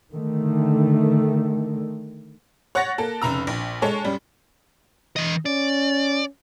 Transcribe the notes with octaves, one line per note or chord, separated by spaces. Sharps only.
D3 D#3 A3
C#5 F#5 C#6 F#6 A6 A#6
A#3 A4
F1 C#3 A#5 E6
A#1
G#3 A4 C#5
F#2 G3
E3 D#5
C#4 D5